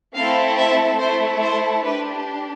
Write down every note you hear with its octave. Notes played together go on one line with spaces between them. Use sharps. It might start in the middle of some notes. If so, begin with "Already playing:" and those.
A3 C4 E4 A4 F5
E5
A3 E4 A4 C5
C5
D4 G4 B4